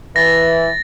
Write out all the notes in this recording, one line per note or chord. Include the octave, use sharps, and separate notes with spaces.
E3 A6 A#6